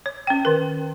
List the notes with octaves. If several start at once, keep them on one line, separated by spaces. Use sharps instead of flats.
C#5
C#4 G5
D#3 A#4